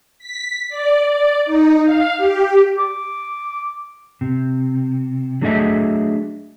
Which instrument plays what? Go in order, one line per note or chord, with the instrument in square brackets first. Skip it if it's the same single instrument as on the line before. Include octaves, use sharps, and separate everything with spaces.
[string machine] B6
D5
D5
D#4
F5
G4
[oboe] D6
[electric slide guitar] C3
F#3 A3 D4 G#4 D#5 E5